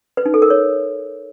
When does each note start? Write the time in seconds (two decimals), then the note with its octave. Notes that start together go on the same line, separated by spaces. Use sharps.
0.17 B4
0.26 D#4
0.34 A4
0.42 A#4
0.50 C#5